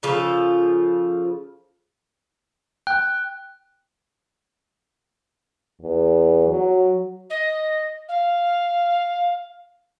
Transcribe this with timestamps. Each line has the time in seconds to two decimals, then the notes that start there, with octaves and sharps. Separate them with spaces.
0.03 C#3 F3 F4 A4
2.87 G5 F#6
5.81 E2
6.48 F#3
7.30 D#5
8.08 F5